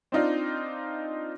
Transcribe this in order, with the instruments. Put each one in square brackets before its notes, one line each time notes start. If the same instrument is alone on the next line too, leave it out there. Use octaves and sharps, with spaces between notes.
[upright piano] C4 D4 D#4 F4 D5